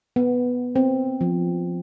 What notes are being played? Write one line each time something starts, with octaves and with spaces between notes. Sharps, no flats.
B3
C4
F3